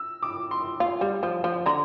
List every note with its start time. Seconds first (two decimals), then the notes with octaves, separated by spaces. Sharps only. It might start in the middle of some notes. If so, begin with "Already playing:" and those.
Already playing: E6
0.23 D6
0.51 C6
0.80 F4
1.01 G3
1.23 F3
1.44 F3
1.66 D3 A#5